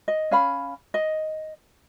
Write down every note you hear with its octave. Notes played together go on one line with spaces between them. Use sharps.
D#5
C#4 F5 B5
D#5